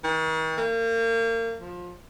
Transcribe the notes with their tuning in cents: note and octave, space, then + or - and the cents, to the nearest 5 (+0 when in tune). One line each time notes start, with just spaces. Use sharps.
D#3 +45
A#3 -35
F3 +20